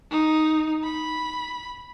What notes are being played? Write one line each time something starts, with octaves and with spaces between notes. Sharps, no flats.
D#4
B5